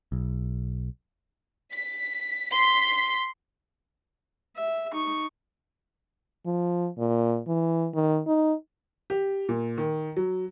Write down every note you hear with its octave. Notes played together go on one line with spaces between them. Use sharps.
B1
B6
C6 B6
E5
D#4 C#6
F3
A#2
E3
D#3
D#4
G4
A#2
D#3
F#3